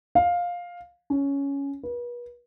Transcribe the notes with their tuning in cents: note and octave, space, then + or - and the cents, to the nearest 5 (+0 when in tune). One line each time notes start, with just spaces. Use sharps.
F5 +10
C#4 +10
B4 -40